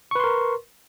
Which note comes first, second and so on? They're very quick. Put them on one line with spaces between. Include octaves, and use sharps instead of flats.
C#6 B4 C6 A#4